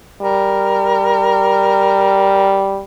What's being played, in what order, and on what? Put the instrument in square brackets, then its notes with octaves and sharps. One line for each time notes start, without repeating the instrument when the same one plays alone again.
[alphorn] G3 [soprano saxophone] A#4